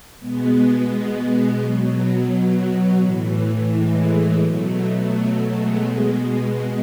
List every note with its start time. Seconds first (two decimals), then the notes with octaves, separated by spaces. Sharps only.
0.19 B2 G#3 B3
1.60 B2 F#3
3.00 A2 E3
3.70 G#3
4.40 B2 F#3 A3
5.10 F#3
5.46 G#3
5.81 B2